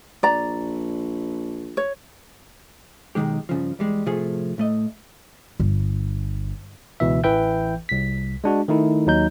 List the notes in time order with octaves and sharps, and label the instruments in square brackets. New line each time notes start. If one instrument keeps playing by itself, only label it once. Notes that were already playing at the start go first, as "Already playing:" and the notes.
[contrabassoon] A#1 [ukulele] D5 A#5
[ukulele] C#5
[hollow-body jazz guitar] B1 G#2 D#3 G#3 G4
G2 C#3 F3
E2 G3 G#3
A2 C3 F3 A3 G#4
A2 A3 D#5
[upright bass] G1
[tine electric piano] C#2 B2 E3 E5
A1 E3 B4 E5 G5 G6
C2 B6
G#3 D4 F#4
D#3 A3 D#4 E4
D#2 F#3 D#4 G6